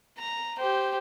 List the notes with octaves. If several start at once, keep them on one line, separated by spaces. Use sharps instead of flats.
A#5
G4 C5